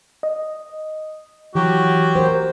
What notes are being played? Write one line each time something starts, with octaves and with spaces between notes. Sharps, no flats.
D#5
E3 F#3 F#4 G4
A#4 C5